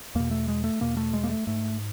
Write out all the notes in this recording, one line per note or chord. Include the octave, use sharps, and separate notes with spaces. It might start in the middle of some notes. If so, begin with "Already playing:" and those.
E2 B2 A#3
A3
G#3
A3
E2 B2 A#3
A3
G#3
A#3
A3
G#2 A3